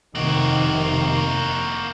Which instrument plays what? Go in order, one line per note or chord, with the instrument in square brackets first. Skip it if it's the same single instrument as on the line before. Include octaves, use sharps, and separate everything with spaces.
[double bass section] F1 C3 D#3 [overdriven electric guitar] A#3 F#4